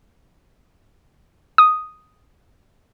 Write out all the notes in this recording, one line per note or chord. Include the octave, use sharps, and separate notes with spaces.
D#6